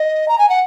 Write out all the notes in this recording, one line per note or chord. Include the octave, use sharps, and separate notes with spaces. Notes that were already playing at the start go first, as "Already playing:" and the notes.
Already playing: D#5
A#5
G#5
F#5